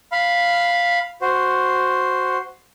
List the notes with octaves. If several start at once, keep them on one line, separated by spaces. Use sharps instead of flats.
F5 B5
F#4 C5